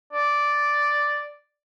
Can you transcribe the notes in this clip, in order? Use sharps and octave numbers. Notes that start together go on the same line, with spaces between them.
D5